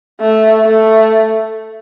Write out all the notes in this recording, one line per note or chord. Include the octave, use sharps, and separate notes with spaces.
A3
A3